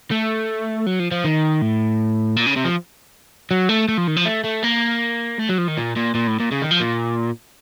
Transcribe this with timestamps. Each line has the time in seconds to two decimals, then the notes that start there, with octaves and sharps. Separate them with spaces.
0.11 A3
0.86 F#3
1.00 F3
1.12 F3
1.24 D#3
1.62 A2
2.37 A#2
2.47 C#3
2.56 C3
2.65 F3
3.51 F#3
3.69 A3
3.89 A3
3.98 F3
4.08 D#3
4.17 F3
4.26 A3
4.44 A3
4.64 A#3
5.39 A3
5.49 F#3
5.58 F3
5.68 D#3
5.77 A#2
5.96 A#2
6.15 A#2
6.27 A2
6.40 A#2
6.52 C#3
6.62 D#3
6.71 F3
6.80 A#2